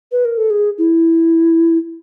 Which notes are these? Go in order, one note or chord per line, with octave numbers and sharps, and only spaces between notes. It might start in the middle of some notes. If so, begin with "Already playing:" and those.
B4
A#4
A4
G#4
E4